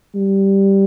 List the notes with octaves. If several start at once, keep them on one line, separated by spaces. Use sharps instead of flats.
G3